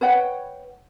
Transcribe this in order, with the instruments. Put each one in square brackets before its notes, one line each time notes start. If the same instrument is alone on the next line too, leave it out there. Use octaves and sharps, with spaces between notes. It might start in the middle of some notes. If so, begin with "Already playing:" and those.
[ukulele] B4 C#5 F#5 G5